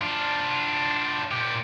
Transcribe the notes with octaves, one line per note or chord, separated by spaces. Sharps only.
D4 F4
A#2 G4